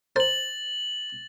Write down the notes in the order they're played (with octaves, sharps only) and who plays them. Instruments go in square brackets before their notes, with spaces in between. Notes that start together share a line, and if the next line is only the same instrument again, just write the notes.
[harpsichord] A#4 C5 [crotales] A6 F#7